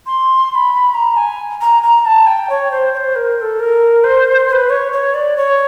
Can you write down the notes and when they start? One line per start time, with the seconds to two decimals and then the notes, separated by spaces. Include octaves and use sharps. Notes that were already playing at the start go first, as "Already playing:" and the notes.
0.07 C6
0.50 C6
0.55 B5
0.94 A#5
1.17 G#5
1.61 A#5
1.83 A#5
2.06 A5
2.27 G5
2.50 C#5
2.72 C5
2.94 C#5
2.97 C5
3.16 A#4
3.38 A#4
3.42 A4
3.60 A#4
4.04 C5
4.49 C5
4.53 B4
4.70 C#5
4.93 C#5
5.14 D5
5.37 C#5